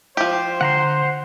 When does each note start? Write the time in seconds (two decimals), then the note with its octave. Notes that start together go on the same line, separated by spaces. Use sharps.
0.17 F3 G4 C5
0.61 D3 F#5 A#5 C6